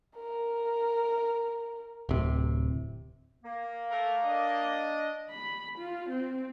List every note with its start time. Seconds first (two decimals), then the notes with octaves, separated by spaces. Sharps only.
0.16 A#4
2.09 D1 C3
3.43 A#3
3.90 A3 A#4
4.24 D4 D#5
5.30 B5
5.78 F4
6.09 C4